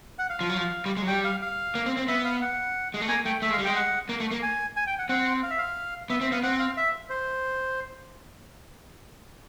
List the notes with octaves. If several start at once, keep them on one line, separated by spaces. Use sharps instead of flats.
F#5
F5
F3
F#3
F3
G3
G#3
F#3
G3 G5
F5
F5
A#3
C4
C4
B3 E5
F5
F#5
G#3
A3
A#3 G#5
A3 G5
A3 E5
G#3
F5
G3
G#3 G5
F#5
A#3
A3
A#3
G#5
G#5
G5
F#5
C4 F#5
F5
E5
F5
B3 E5
C4 E5
B3 F5
C4 F#5
F5
E5
C5